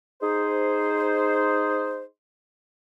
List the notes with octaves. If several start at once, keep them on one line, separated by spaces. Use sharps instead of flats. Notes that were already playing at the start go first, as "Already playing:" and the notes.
D#4 G#4 C5